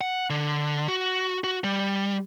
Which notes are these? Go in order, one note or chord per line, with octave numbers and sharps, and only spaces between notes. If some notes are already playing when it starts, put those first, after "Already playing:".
F#5
D3
F#4
F#4
G3